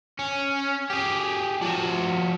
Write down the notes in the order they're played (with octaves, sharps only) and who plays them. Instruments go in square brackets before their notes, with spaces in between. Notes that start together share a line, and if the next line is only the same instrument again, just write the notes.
[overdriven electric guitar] C#4
G4 G#4
F3 F#4